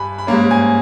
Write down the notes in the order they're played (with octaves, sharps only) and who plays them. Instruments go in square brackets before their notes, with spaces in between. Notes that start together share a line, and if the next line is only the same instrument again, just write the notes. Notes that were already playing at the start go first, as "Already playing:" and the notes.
Already playing: [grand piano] G2 G#5 B5
B5
G#2 G3 A#3 C#4 A#5
G#5